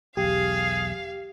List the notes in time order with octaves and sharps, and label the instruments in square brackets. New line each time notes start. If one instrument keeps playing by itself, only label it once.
[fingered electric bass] E1 B1 [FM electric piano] G4 [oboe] G#4 [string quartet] F5